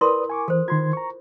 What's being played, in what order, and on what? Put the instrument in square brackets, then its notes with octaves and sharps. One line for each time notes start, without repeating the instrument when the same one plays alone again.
[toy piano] E4 A#4 C6 [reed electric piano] B4 D5 D#6
[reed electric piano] G#5 C#6 D6
[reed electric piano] E3 [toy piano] A4 C5
[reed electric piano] D#3 C6 G#6 [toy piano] F4
[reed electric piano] A#5 C#6